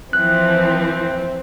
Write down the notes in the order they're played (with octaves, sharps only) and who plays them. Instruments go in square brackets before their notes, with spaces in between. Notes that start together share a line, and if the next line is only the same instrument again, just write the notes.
[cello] E3 F3 [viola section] C4 [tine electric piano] F#6